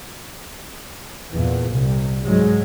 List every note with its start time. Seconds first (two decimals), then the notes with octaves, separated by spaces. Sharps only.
1.30 E2 A#2
1.69 C2
2.22 G#2 F#3 G#3